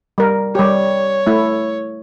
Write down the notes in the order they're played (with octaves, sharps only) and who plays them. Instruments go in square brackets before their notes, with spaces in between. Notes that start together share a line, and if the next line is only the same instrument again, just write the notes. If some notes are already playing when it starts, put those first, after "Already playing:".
[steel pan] G3 A#4
[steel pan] G3 G4 [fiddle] C#5
[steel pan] A3 E4